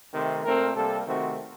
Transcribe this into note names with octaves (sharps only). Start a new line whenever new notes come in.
C3 D#3 A3 C4
A#2 A3 C4 A#4
C3 G3 A#3 A4
C3 D#3 A3 C4 F#4